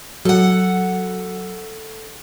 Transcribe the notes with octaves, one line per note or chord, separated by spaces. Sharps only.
F#3 A4 F#5